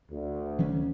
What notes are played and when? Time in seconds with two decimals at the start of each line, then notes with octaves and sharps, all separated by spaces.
0.11 D2
0.59 D#3 F#3 C#4